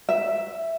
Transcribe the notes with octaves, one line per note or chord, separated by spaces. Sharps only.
E5